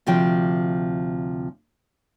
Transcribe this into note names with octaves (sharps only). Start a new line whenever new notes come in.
D2 C3 F3 G5